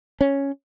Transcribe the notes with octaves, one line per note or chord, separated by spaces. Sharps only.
C#4